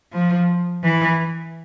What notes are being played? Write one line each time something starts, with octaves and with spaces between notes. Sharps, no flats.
F3
E3